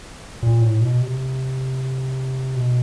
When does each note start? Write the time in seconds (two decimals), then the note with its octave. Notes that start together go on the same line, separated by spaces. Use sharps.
0.43 A#2
0.62 A2
0.81 B2
1.01 C3
2.56 B2